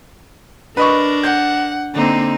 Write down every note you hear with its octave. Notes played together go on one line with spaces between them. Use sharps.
D4 A#4 B4 D#5 C#6
F#5 G6
D3 A#3 C4 D#4